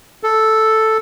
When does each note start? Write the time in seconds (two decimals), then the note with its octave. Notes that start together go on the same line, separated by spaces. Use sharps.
0.23 A4